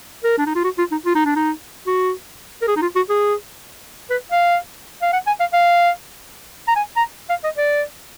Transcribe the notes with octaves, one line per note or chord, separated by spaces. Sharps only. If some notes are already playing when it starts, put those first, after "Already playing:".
A#4
D4
D#4
F4
F#4
F4
D#4
F4
D#4
D4
D#4
F#4
A#4
G#4
D#4
F4
F#4
G#4
B4
F5
F5
F#5
G#5
F5
F5
A#5
G#5
A#5
F5
D#5
D5